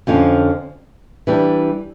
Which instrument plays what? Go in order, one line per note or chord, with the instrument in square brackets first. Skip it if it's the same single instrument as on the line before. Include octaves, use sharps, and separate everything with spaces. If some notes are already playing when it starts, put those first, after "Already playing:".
[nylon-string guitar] F2 D3 F3 C#4
E3 G3 D4